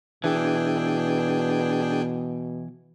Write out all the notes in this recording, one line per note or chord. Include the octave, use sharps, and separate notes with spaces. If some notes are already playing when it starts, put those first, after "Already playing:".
B2 E3 D4 G#4 G5